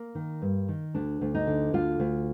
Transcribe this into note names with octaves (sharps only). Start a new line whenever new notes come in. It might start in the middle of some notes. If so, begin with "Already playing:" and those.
Already playing: A#3
D#3
G2
D#3
D2 D4
D2
D#4
D3
D2 F4
D2